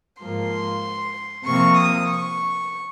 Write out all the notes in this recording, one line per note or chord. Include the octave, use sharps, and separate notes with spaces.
G#2 F3 A#3 C6
C3 F3 A#3 C#6
D#6
C#6